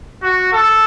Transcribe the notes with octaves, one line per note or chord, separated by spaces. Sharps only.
F#4
A4